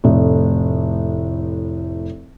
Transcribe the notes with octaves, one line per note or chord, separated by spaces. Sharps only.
F1 A2